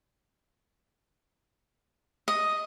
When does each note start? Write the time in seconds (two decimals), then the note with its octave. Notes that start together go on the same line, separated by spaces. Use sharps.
2.28 D#5